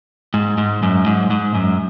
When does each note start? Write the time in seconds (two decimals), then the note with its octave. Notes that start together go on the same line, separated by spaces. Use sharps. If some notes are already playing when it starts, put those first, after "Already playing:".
0.34 G#2
0.58 G#2
0.83 F#2
1.06 G#2
1.30 G#2
1.55 F#2